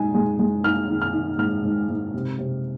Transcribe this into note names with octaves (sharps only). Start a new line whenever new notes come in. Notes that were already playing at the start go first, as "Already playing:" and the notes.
Already playing: G#2 G#3 D#4 G#5
G#3
G#3
D#4 F6
D#3
F6
D#3
G#2 F6
G#2
G#2
C3
C3